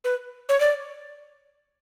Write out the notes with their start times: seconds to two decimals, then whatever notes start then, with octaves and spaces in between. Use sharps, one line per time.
0.04 B4
0.49 C#5
0.60 D5